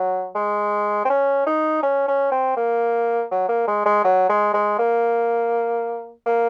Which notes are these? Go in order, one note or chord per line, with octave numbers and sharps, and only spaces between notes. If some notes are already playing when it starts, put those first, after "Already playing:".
Already playing: F#3
G#3
C4
C#4
D#4
C#4
C#4
C4
A#3
F#3
A#3
G#3
G#3
F#3
G#3
G#3
A#3
A#3